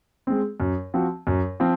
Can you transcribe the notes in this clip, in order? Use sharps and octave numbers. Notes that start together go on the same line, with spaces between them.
G#3 C4
F#2
F3 C4 F#4
F#2
F3 C4